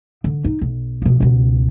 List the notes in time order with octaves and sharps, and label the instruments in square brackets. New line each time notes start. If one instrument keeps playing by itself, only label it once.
[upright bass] D3
D#4
B1
B2 F3
C#2 B2